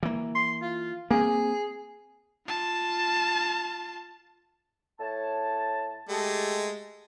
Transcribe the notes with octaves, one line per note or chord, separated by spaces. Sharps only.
E3 A#3
C6
F4
A#3 C4 G#4
F4 A5
A2 C#5 A5
G#3 A3 G4 A5